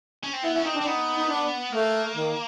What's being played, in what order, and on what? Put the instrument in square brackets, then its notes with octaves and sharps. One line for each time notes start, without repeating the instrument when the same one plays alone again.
[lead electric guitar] C#4
C4
[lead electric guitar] B3 [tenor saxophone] E4
[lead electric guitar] C#4 [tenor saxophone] E4
[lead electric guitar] C4 [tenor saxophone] D#4
[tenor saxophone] D4
[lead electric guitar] C4
[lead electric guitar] B3 [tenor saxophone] D#4
[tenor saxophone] D#4
D4
[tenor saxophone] A3 [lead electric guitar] A#3
[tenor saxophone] D#3